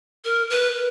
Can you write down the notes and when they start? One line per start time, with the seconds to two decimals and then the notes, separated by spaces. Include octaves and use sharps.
0.25 A#4
0.50 B4